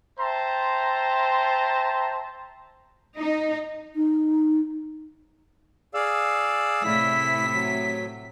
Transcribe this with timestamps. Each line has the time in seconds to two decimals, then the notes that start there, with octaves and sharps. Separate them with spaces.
0.19 C5 E5 G5 A5 A#5 C6
3.18 D#4
3.95 D#4
5.94 G#4 D5 F5 E6
6.84 A2 C3 E4 B6
7.53 F#3